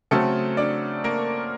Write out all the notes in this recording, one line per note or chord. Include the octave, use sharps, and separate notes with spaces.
C#3 F#3 A3 C4 A4
D4 D5
A#3 A#4